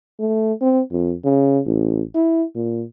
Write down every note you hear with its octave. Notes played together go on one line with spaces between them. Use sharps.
A3
C4
F2
C#3
A1
E4
A#2